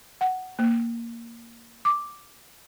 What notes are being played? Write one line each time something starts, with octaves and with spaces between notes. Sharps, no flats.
F#5
A#3
D6